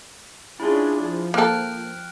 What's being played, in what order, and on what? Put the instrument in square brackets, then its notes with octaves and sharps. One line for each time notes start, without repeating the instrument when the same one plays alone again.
[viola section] C#4 D4 G#4 [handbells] E4 F4
[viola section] F3
[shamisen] A#3 A4 [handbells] G5 F6 F#6